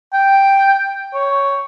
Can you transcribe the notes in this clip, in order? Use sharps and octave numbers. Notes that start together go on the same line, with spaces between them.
G5
C#5